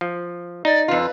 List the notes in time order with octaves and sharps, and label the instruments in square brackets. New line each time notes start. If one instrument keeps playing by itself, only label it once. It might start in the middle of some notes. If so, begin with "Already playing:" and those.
[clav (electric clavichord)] F3
[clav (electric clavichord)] D#4 [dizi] D5
[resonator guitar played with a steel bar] F2 F4 [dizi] B4